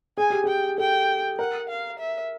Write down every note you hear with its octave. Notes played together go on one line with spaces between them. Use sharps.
G#4 G#5
G4
G#4 G5
A4 G5
A#4 F#5
F5
E5